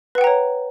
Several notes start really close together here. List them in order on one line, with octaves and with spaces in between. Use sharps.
B4 F#5 G5 A#5 C#5